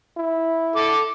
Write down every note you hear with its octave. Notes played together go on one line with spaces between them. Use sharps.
E4
A4 D6